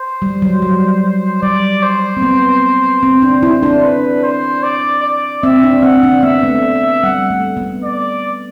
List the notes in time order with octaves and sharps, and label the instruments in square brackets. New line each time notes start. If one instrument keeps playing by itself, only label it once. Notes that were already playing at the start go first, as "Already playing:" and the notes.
Already playing: [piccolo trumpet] C5
[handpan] G3
F#3
G3
[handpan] G3 [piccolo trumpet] D5
[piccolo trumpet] C5
[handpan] C4
B3
C4
D4
E4
D4
[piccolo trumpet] B4
C5
D5
D5
[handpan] C4 [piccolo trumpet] E5
[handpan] D4
[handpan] C4 [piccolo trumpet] F#5
[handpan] D4
[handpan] B3 [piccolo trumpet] E5
[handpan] A3
[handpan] G3 [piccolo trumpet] F#5
[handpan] A3
B3
[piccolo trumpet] D5